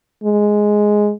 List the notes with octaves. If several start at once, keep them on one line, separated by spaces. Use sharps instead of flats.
G#3